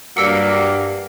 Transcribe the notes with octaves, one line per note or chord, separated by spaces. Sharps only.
G2 F#3 G3 A#3 F5 E6 C#7